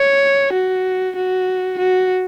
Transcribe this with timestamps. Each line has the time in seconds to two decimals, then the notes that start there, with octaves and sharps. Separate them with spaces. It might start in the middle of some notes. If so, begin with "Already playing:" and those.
Already playing: C#5
0.53 F#4
1.16 F#4
1.78 F#4